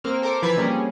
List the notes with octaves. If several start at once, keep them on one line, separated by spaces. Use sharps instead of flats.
A#3 C4 F6
A4 A#4 C5 D6
E3 F3 B4 B5 G#6 A6
C3 G3 A#3 C#4 G#4